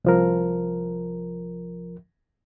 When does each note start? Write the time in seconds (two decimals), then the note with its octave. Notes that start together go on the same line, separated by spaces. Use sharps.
0.05 C2 F3 A#4